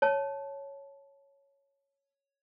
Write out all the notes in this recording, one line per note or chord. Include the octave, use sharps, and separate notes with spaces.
C#5 A5